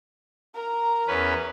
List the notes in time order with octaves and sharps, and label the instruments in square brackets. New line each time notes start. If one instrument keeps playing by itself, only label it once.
[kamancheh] A#4 A#5
[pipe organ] E2 C#4 B4